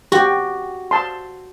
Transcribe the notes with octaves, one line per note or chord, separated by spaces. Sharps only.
F#4 G4
A5 C6